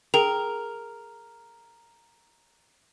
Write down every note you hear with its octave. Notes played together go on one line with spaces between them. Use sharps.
G#4 A#4 G5 F7